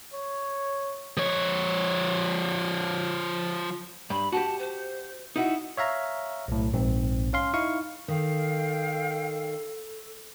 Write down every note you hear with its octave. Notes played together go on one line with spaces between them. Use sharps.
C#5
F3 C#5
G2 B5
F#4 G4 A5
C5
D#4 E4 F#4 F#5
C#5 E5 F5 A#5
B1 A2
A#1 G#2 C4
C#4 F5 C6
D#4 E4 F5 C#6
D#3 A4 F5 G5